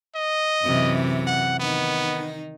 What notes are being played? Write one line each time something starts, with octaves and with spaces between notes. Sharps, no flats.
D#5
F#2 C3 E3
F#5
D#3 B3 D#4